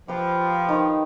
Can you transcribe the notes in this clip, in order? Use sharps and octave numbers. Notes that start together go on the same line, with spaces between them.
F3 G4 B4
D#3